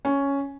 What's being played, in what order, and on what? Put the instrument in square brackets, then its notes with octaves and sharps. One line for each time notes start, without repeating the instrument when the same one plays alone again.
[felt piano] C#4